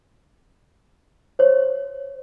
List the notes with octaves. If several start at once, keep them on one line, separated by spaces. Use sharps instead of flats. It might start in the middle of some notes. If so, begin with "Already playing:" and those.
C5 C#5